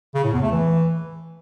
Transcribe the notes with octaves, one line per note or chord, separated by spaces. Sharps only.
C#3
A2
E2
A3
E3